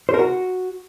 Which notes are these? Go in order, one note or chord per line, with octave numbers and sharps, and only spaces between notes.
C5
A#4
F#4